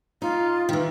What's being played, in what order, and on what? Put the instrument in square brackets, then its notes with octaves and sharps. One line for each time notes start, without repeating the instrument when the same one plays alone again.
[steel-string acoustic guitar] D#4 [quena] F4
[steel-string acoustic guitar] D#3 E3